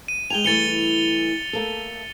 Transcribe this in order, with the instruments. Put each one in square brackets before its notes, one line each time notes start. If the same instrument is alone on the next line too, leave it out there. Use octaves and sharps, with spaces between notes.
[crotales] D#7
[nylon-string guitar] G#3 G5 G#5 [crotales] F7 G7
[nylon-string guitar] E3 G3 A3 [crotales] A6 C#7 G7
[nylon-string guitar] A3 A#3 A4